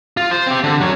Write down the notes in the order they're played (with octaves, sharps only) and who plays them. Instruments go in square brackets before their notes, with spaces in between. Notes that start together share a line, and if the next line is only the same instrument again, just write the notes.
[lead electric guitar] F4
C5
C4 G4
D3
F#3 C#4